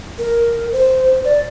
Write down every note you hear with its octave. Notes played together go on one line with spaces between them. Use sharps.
A#4
C5
D5